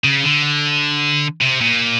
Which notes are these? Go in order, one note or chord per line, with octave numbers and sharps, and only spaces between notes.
C#3
D3
C3
A#2